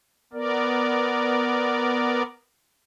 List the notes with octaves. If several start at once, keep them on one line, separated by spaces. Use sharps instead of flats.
B3 A#4 D5